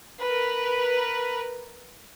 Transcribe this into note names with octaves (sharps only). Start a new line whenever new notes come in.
A#4 B4